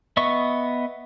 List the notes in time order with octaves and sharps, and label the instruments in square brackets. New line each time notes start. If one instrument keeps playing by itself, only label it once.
[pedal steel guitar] B3 D#5 E5 C#6